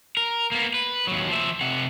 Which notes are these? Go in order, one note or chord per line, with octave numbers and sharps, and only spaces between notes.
A#4
A#3 B3
B4
D#2 F#3
F3 E5
C3 F#5